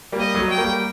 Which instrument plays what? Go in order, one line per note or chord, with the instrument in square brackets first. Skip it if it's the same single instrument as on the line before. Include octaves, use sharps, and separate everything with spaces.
[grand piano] G3 A#3
[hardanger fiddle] D#5
[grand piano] F#3 A3
[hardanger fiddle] G5
[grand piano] G3 A#3